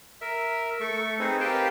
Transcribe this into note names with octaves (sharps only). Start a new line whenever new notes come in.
A#4 E5
A3 A4 C#6
C4 D#4 G#4 B4 C5
G4 A#4 B4 F5 G5 A5